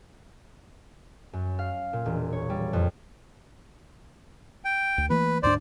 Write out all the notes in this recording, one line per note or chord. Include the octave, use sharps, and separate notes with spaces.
F#2
F5
A#2
E1
C#5
G3
F2
G5
D2
E3 A3 A#3 B4
D2 G#2 D4 C5 D5